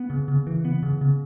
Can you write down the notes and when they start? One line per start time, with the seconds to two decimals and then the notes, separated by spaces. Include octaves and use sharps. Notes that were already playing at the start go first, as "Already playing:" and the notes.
Already playing: B3
0.10 C#3
0.28 C#3
0.47 E3
0.65 B3
0.83 C#3
1.01 C#3